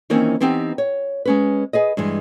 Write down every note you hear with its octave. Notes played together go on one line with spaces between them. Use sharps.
D#3 E3 A#3 C4 C#4 D#4
E3 B3 C4 D#4 F#4 G4
C#5
G#3 C#4 B4
G#4 B4 D#5
G2 E3 G#3